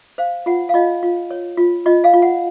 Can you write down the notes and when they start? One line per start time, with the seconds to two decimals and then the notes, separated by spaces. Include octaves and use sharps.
0.18 C5 F5
0.46 F4 F#5
0.69 F5
0.74 F4 D#5
1.03 F4
1.31 C#5
1.57 F4
1.86 F4 D#5
2.04 F5
2.14 F4
2.22 F#5